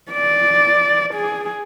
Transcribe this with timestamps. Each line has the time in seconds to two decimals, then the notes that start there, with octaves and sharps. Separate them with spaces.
0.12 D5
1.14 G#4